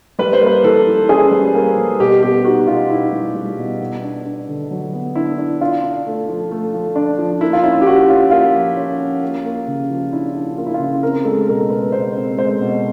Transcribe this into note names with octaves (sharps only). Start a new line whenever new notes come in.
G3 B4
C5
A#3
B4
E3 A4
E3
C#4 G#4
G3
A#3
G3
B2 G4
B3 G4
D#4 F#4
B2 F4
D#4 E4
G3
G3
B2
B3
D4
D4
D3
F#3
B3
D4 E4
D4
D4 F4
D4
A3
F3
A3
F3
D4
F3
A#3 E4
F4
C#4 E4
G4
C#4 F#4
C#4 F4
A#3 F4
F3
C#4
C#4
A#3
A#3
C#3
F3
D4 E4
D4
A#3 F4
E4
F4
C#3
C4 A#4
G#3 A4
B2 A#4
G#3 B4
B2 C5
C4
G#3 C5
B2